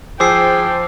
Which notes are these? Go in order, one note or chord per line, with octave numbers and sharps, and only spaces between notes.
F3 G#4 C5 G5 D6 E6 C7